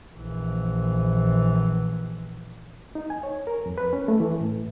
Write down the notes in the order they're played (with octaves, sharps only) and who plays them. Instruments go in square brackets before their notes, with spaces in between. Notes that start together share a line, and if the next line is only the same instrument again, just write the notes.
[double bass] A#1 E3
[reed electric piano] D#4
G#5
C#5
A#4
F2
B4
C#4
A3
E3
A2